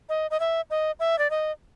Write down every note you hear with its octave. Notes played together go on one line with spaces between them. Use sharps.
D#5
D#5
E5
D#5
E5
D5
D#5